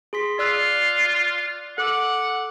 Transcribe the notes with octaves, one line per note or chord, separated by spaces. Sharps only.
G#4 C6 B6
F4 D5 E6 F#6
A4 F#5 D6 E6